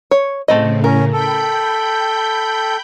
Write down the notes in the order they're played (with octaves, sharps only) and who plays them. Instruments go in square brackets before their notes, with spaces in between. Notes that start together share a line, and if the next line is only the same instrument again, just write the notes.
[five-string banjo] C#5
[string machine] A2 C#3 [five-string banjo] A3 C4 D#5
[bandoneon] C#4 [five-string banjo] A#4
[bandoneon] A4 [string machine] G5 B5 G6